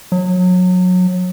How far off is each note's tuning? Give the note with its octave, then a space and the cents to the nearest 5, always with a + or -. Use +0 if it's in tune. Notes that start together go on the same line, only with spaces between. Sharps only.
F#3 -25